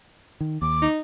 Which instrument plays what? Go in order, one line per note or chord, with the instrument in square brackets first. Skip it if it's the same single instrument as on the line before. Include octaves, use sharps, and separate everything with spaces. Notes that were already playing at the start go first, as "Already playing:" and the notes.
[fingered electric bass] D#3
[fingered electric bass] D#2 [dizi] D6
[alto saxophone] D#4